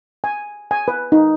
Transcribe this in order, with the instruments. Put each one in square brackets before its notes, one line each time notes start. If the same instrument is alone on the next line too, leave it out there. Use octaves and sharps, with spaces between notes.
[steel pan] G#5
G#5
B4
D#4